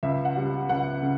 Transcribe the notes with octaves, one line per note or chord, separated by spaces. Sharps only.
C#2 E5
F#5
C#3 G3
C#2 F#5
C#3